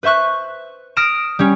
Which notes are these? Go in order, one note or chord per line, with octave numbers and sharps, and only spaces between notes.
B4 C5 E5 C#6 F#6
D#6 F6 A#6 D7 E7
G3 C#4